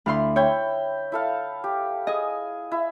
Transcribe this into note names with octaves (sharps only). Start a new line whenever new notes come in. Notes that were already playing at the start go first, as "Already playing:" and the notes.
D2 E4 F5 B5 C6
E4 C#5 G5
E4 A4 F5
G4
G#4 D#5 G#5
E4